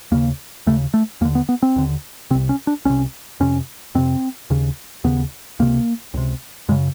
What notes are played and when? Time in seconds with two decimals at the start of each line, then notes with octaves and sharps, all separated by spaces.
0.12 D#2 C#3 A#3
0.67 D#2 C#3 A3
0.94 A3
1.21 D#2 A#3
1.25 D3
1.35 B3
1.49 B3
1.62 C4
1.76 D#2 D3
2.31 C3 C4
2.34 C2
2.49 C#4
2.67 D4
2.85 C2 C3 C#4
3.40 F2 C3 C#4
3.95 F2 C3 C4
4.50 D#2 C#3
5.04 D#2 C#3 B3
5.59 C#2 C3 A#3
6.14 C#2 C3
6.69 F#2 C#3 G#3